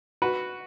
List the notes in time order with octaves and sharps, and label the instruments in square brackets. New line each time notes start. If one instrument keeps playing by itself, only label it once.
[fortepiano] F#4 B4